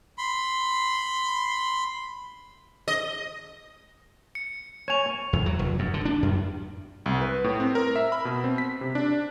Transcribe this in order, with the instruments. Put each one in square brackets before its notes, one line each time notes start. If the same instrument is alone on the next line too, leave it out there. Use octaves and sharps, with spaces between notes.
[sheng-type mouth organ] B5 C6
[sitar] D#5
[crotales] C#7
[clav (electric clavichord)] C#5 G#5 [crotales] C#6 F7
[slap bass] E2
F#3
F1
F#2
D3
D4
F#2
[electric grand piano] C2
B4
A2
C4
A#4
E5
B5
B2
C4
B6
C3
D4